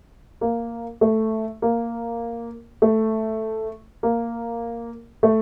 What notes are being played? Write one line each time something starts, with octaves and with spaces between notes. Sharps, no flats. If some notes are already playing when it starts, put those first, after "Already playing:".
A#3
A3
A#3
A3
A#3
A3